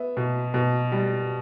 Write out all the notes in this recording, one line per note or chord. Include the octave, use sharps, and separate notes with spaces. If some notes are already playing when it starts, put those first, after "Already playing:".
Already playing: B3 E5
B2
B2
G3